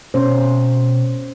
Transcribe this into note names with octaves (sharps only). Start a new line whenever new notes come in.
B2 C#4 C5